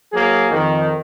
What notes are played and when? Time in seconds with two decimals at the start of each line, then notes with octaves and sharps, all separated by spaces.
0.13 F#3 A#3 G#4
0.51 F2 D#3